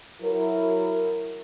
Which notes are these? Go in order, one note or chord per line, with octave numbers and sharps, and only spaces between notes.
F#3 E4 A#4